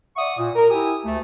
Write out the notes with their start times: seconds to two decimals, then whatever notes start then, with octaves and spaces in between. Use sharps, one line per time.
0.16 D5 E5 F#5 C#6 D#6
0.38 A#2
0.56 A#4
0.71 E4 G4 G#5 D#6
1.05 D2 A3